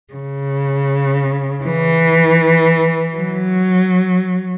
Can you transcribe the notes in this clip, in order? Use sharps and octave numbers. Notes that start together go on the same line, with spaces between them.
C#3
E3
F#3